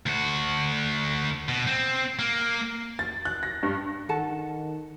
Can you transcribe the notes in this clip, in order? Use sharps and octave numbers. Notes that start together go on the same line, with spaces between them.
D2 F#4
B2
C4
A#3
A6
F#6
A#6
G2
D#3 A4 F#5 A5